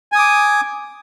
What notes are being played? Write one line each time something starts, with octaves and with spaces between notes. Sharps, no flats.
G#5 D6 D#6